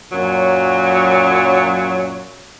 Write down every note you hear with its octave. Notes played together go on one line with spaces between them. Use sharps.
F#2 A#2 F#3 C#5